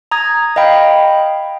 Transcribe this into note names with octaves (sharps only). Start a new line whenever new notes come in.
A#5 D#6 G#6
D#5 F5 G5 B5